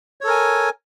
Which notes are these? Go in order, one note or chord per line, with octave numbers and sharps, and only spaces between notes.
A4 A#4 C#5 G#5